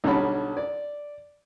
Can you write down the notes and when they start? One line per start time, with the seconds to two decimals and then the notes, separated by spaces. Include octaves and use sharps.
0.04 B1 D3 G3 C#4 A5 B5
0.57 D5